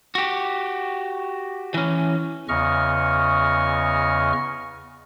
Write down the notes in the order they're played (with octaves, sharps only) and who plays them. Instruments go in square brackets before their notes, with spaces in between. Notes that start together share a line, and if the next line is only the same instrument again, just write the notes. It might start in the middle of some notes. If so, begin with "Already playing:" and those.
[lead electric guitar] F#4 G4
E3 C#4
[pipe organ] E2 C#3 D#5 C#6 F6